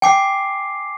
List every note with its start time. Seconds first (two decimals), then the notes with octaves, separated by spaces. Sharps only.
0.02 G5 G#5 D6 C7